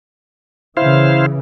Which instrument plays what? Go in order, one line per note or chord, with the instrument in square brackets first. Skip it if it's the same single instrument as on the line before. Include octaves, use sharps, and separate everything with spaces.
[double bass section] C#3 E3 [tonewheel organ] E4 C5 F5